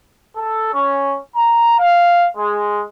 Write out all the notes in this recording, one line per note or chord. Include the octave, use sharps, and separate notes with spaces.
A4
C#4
A#5
F5
G#3